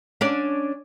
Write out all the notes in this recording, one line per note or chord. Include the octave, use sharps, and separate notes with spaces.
C#4 D4 D5